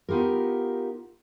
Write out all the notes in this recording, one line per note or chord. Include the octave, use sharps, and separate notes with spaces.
B3 D#4 F4 G4 A#4